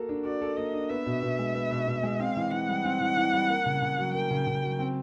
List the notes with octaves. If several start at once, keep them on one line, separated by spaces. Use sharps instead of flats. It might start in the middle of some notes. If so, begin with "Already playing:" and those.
Already playing: A#3 F#4 A4
D4
F#4 D5
A4
A#3 D#5
D4
B3 E5
B2
B2
G#3
B3
B2
B2
G#3
C4 F5
E3
E3 F#5
G3
C4
E3
E3
G3
A#3
C#3
C#3
F#3
A#3 G5
C#3
C#3
F#3
C4